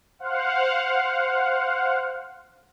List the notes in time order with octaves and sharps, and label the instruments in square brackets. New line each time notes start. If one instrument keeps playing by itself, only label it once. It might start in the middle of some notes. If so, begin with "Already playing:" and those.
[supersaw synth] C5 F5 F#5